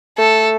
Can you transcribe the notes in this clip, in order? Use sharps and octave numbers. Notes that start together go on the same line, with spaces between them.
A3 A4